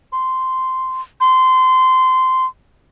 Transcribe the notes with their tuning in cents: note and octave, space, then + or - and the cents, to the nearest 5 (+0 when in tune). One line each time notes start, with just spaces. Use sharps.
C6 -10
C6 -20